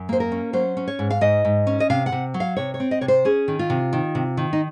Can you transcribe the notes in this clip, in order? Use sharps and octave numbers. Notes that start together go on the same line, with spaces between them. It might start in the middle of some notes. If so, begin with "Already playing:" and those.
Already playing: F#2
A#3 C5
A#4
C#4
F#3 C5
C#4
C#5
G#2
F5
G#2 D#5
G#2
C#4
D#5
C3 F5
F#5
C3
F#3
F5
C3 C#5
C#5
C4
D#5
C3 C#5
C5
C#4 G#4
D#3
F4
C3
D#3
C3
D#3
D#4